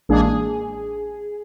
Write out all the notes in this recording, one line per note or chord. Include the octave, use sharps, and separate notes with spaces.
A1 G#3 A#3 D4 G#4
G#4